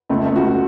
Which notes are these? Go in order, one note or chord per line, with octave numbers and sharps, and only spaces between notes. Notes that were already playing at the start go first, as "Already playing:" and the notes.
C#2 A3
A3
C#2 F#4